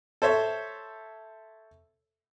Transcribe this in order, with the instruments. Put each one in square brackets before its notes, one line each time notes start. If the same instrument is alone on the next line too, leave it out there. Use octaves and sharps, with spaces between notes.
[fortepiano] A4 C5 C#5 E5